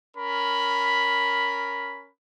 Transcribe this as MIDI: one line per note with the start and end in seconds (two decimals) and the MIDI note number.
0.17 2.10 61
0.17 2.10 70
0.17 2.10 83